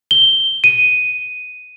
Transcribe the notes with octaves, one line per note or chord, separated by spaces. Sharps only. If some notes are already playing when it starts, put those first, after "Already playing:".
G7
D#7